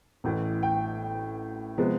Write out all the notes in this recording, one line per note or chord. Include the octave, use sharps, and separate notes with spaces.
A1 A2 E3
G5
C3 F3 G#3 B3